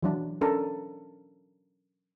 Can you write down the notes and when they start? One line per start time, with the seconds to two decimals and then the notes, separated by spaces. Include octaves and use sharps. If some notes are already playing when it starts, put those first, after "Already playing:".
0.03 E3 F#3 D4
0.41 C#4 D4 A4 A#4